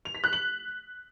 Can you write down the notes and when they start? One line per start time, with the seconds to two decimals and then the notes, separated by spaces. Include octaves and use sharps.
0.05 F7
0.15 B6
0.24 F#6
0.33 F#7